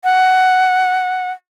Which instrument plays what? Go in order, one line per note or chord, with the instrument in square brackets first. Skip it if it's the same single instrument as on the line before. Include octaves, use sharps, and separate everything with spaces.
[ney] F#5